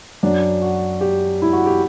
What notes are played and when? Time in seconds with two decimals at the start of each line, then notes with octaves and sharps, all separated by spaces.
0.23 F#2 F#3 D4
0.62 F#4
1.01 G4
1.42 E4
1.53 F#4
1.66 G4